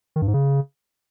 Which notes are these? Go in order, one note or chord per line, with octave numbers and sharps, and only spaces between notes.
D#3
G2
G#2
C#3